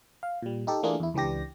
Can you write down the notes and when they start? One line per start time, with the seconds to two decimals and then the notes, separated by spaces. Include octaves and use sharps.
0.23 F5
0.42 A#2 G3
0.67 D#4 G4 A4
0.83 E3 A3 A#3 D4 F4 G#4
1.00 E2 E4
1.14 C#2 E3 D4 G4 A#6